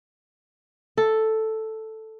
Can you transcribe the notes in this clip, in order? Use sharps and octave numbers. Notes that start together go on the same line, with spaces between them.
A4